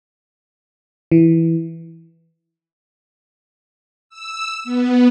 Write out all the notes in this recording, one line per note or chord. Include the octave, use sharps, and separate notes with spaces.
E3
E6
B3